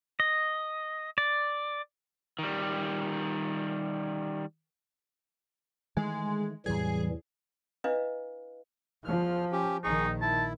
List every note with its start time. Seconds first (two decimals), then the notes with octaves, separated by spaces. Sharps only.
0.20 D#5
1.18 D5
2.39 D#3 G3
5.97 D#3 E3 G#3 A3
6.66 E2 A2 C3 E3 F#3 G3 G#4
7.84 D4 E4 B4 D#5 F5
9.05 E2 F3 F6
9.52 C#4 G4
9.84 A#1 D#3 D#4 G#4 C#6
10.21 E4 A5